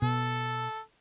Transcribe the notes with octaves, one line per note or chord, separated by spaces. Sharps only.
B2 A4